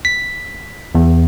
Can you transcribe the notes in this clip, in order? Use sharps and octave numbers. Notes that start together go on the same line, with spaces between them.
B6
E2